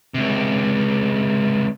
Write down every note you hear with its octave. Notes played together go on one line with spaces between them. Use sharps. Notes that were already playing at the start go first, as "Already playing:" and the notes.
C#2 C3